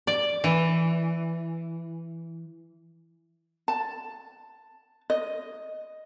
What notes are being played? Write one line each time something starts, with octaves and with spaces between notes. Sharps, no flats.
D5
E3
A5
D#5